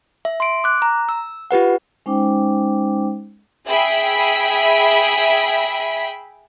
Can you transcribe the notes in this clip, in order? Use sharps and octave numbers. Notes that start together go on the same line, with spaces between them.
E5
C6 D7
D6 F#6
A#5
E6
F4 G4 B4 F#5
G#3 C#4 D#4 C5 G5 D6
G#4 E5 G5 B5 B6